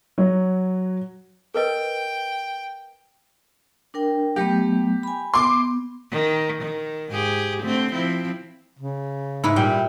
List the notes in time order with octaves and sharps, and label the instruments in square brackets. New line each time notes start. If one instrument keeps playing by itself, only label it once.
[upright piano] F#3 F#4 C#5
[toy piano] A#4 B4 D#5 [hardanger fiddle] G5
[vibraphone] D4 A#4 G5
[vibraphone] F#3 A3 B3 [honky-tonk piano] G4
[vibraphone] G#5 B5
[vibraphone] B3 [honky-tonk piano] C6 D6
[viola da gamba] D#3
D#3
G#2 G4 G#4
D3 A3 C4
F3 C4 E4
[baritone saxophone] C#3
[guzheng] G#2 E4 B4
[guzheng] A#2 G5 [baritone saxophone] G3